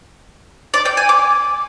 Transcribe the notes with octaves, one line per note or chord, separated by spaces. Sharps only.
D5
G5
G#5
D6